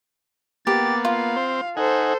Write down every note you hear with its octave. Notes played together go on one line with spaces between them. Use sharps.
A#3 B3 G4 A6
F4 F5
C4 C5
D#4 A4 C5 F#5 G#5